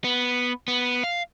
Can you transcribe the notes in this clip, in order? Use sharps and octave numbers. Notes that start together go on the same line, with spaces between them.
B3
B3
F5